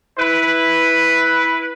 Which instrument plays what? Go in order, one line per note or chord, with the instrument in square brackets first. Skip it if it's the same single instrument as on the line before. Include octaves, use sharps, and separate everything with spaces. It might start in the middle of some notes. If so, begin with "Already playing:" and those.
[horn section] E4 B4